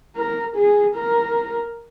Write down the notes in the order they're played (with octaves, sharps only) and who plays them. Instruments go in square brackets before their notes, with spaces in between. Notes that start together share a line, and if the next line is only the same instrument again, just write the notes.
[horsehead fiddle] A#4
G#4
A#4